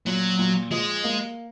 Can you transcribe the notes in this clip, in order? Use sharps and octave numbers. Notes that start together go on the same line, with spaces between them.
A#2 F#3
A#2
F3 G#3
A#3